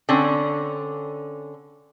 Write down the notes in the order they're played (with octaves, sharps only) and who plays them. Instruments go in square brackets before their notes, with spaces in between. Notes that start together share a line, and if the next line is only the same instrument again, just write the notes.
[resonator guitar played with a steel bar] D3 C4 C#4